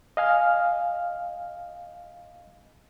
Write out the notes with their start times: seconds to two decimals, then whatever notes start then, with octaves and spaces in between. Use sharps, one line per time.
0.17 D#5 F5 G#5 F6